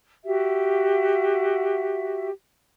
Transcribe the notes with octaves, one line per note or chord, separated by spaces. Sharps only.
F#4 G4 E5